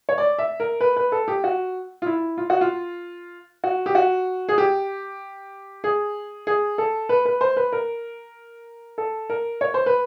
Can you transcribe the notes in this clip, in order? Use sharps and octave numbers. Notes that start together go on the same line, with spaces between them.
C#5
D5
E5
A#4
B4
B4
A4
G4
F#4
F4
E4
F4
F#4
F4
F#4
G4
F#4
G#4
G4
G#4
G#4
A4
B4
B4
C5
B4
A#4
A4
A#4
C#5
C5
B4